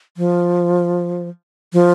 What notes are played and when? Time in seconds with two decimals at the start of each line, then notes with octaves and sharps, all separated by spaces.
0.17 F3
1.73 F3